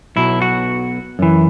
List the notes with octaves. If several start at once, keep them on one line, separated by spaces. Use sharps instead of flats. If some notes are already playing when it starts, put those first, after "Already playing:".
B1 B2 F#3 E4
F#4
F#2 E3